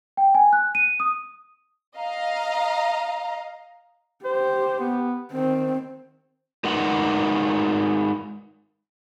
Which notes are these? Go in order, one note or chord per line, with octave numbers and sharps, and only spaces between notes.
G5
G#5
F#6
D#7
D#6
D#5 F5 A#5
G4 C5
B3
D#3 C4
G#3 D#4 A#4 B4 F#5